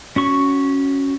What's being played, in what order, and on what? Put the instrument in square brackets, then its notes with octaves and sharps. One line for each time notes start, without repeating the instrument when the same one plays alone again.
[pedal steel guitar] C#4 F#4 C#6